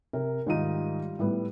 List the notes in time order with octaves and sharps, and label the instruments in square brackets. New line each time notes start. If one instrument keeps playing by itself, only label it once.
[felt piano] C3 [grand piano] A#4
[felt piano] G#2 D#3 D#4 [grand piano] G3 F4 D#7
[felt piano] A2 G3 B3